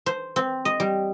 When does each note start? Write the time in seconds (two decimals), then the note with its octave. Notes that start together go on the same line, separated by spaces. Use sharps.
0.06 C5
0.36 C4
0.65 D#5
0.80 G3